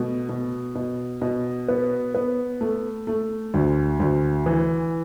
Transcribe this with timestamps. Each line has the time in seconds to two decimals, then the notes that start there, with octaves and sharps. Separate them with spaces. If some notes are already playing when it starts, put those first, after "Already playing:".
Already playing: B2 A3
0.29 B2
0.75 B2
1.22 B2
1.68 B3
2.14 B3
2.61 A3
3.07 A3
3.54 D2
4.00 D2
4.46 E3